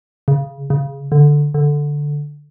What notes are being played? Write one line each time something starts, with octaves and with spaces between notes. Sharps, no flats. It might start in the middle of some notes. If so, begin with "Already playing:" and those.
C#3
C#3
D3
D3